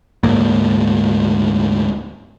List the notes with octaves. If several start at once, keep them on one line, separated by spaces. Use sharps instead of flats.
D2 G#2 A#3